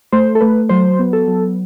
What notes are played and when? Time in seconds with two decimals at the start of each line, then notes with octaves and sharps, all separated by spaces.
0.12 A3 C5
0.35 A4
0.41 A3 B4
0.69 F#3 C5
0.99 B3
1.13 A4
1.28 F#3